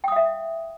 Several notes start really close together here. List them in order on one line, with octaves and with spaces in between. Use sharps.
G5 D#6 F5 E5